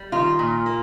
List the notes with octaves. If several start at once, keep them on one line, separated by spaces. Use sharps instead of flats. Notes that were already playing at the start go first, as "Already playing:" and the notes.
Already playing: G3
D#3 F4
A#2
A#3